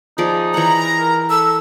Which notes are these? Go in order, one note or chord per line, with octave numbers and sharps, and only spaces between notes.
F3 D#4 G#4 D5
E3 F#5 A#5
A#4
A4 E6